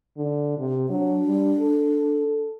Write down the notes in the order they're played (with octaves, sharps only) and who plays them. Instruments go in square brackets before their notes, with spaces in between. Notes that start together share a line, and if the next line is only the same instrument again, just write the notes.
[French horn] D3
C3
[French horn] F#3 [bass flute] D4
[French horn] G3
A4